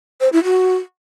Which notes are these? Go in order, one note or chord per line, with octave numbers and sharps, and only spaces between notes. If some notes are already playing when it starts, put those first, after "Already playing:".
C5
E4
F#4